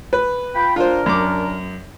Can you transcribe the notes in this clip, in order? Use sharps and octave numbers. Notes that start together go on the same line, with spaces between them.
B4
F4 G5 B5
D4 F4 A#4 C5
F#2 D6